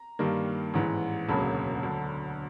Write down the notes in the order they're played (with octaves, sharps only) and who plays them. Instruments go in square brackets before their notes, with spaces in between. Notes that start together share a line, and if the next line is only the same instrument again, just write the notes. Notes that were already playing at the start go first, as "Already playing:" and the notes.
Already playing: [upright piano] A#5
G2 D#3 G3 A#3
A1 G#2 E3
E1 D2 C#3 F#3 A#3 A5 B5
D2 D3 F#3